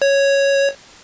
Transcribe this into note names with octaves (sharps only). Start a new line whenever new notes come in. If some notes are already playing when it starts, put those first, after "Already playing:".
C#5